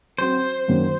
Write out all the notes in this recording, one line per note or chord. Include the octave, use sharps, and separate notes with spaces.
F#3 C4 F#4 C5
F#2 D#3 F#3 A#3 C#4